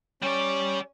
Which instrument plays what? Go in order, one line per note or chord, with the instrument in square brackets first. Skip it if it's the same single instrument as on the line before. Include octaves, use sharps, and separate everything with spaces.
[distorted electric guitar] G3 D5 [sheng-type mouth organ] C#4